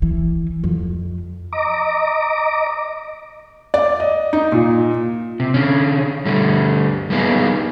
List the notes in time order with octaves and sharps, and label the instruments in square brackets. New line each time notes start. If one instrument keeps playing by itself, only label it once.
[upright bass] E3
F2
[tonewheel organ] D#5 A#5 D6
[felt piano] D5
D#5
D#4
A#2
[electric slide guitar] C3
D3 C#4
D3 G3 A3
G3 A#3 B3 D#4 G#4